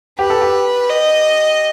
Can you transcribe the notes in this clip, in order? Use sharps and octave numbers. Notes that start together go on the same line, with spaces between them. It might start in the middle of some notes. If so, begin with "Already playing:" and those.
G4 B4
A4
G4
D#5